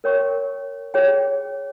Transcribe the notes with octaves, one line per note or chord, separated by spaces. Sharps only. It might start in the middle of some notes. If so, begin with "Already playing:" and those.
A#4 C#5 G5 C#6
G#4 C#5 G5